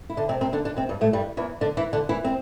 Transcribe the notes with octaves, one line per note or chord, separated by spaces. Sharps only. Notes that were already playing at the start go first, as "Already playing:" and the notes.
E4
D3 D4
C3 C4
C3 C4
D3 D4
D3 D4
C3 C4
G2 G3
A2 A3
G2 G3
E2 E3
D3 D4
E3 E4
D3 D4
E3 E4
C4